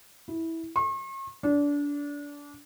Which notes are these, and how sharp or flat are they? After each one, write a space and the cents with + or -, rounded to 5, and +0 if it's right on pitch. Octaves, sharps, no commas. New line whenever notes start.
E4 -15
C#6 -45
D4 -25